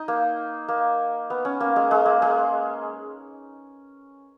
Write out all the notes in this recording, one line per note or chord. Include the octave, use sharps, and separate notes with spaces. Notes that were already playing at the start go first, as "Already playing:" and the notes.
Already playing: D#4
A#3
A#3
B3
C#4
A#3
G#3
G#3
A#3
G#3